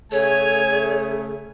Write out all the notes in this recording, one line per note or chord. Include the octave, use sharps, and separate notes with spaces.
C#3 A3 G#4 C#5 G#5